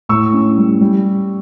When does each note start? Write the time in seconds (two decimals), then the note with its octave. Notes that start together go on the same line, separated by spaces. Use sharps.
0.09 A2 C#6 E6
0.33 C#4
0.57 G3
0.81 G3